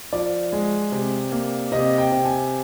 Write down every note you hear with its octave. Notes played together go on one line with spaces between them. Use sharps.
F3 D5
G#3
C3
A#3
C3 D#5
G5
C3
G#5